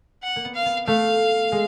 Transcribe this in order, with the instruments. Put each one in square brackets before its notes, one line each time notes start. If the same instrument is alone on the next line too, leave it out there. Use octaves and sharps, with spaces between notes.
[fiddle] F#5
[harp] A#3
B3
[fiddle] F5
[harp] B3
[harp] A3 [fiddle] F5
[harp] G#3